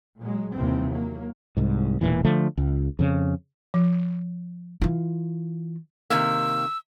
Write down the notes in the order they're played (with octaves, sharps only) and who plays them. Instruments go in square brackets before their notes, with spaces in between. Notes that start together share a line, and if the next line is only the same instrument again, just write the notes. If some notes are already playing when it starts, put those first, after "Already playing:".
[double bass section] A#2 F#3 G#3
D#2 C3 E3 G3 C4
F#3 A#3
[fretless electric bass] C2 G#2
E1 A#1 A#2 E3
D3 F3 A3
C#2
F2 C#3
[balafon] F3
[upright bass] E3 F4
[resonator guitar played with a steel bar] C3 D#3 A#3 [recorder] E6